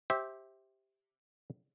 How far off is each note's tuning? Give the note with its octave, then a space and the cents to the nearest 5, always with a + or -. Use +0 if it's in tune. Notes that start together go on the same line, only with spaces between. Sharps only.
G4 +0 C5 +15 E5 -15